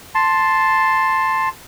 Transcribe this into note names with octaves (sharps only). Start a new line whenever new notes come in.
A5 C6